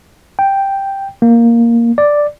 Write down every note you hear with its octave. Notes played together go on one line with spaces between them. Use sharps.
G5
A#3
D5